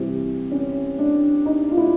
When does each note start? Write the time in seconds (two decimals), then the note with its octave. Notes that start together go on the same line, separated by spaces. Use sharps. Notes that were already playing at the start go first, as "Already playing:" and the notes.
Already playing: C3 E3 G3 C4 G4
0.51 C#4
0.98 D4
1.46 D#4
1.71 F4
1.78 E4